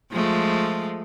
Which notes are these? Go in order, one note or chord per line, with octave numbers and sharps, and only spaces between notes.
F3 G#3 A3